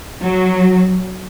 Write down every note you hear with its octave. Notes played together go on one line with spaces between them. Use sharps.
F#3